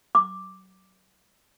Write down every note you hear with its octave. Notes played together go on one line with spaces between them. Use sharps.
D6